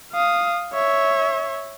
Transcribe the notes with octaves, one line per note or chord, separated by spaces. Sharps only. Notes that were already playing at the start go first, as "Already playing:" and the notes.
F5 D#6
C#5 E5